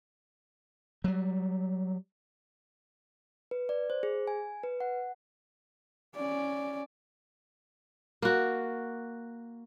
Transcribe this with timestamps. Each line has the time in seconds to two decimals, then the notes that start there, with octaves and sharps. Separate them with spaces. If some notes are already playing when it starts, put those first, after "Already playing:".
1.04 F#3 G3
3.51 B4
3.69 D5
3.90 C5
4.03 G#4
4.27 G#5
4.63 B4
4.80 F#5
6.16 C#4 D5
8.22 A#3 F#4